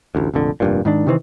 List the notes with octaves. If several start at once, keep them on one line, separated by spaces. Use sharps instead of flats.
A1 D2
F1 A#1 F2 D3
F1 G2 A#2
G#2 D#3 D4
C3 D#3 E3 C4